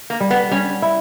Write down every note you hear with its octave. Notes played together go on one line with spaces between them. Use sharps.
A#3
G3
B3
G3 C#4
E4